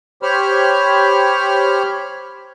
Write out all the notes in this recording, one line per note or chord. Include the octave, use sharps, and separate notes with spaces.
G4 C5 C#5 B5 F6